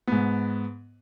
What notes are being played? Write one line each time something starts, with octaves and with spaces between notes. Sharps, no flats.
G#2 B3